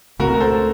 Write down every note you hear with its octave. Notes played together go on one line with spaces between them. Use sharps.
C#2 C#3 A3 C4 F#4 A#4
A#4
A4 C5